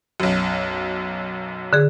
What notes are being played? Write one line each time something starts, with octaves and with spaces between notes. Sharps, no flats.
B1 F#2
D3 G#4